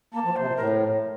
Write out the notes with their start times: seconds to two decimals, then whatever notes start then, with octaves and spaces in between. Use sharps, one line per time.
0.13 A#3 A5
0.25 F3
0.36 C3 C5
0.47 A#2
0.57 A2 A#4